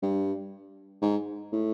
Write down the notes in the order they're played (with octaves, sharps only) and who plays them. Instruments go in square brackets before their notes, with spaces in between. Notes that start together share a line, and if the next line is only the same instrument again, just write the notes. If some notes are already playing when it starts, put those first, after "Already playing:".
[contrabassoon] G2
G#2
A2